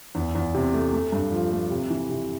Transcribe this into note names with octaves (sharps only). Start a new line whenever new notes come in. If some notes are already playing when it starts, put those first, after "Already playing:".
E2
E2
C3
A3
A3
G2
F3
A3
C3
E3
C3